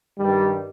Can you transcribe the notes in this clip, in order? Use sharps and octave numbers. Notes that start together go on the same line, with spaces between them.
G2 D#3 G3